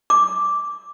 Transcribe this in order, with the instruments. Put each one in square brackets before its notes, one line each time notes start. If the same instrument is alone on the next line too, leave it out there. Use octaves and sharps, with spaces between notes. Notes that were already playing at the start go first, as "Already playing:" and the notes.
[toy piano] D6